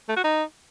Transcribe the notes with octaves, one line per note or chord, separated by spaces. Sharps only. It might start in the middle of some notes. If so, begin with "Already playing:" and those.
A3
F#4
D#4